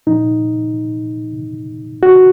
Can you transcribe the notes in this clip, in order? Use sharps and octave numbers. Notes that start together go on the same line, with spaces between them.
A#2 F3 D#4
F#4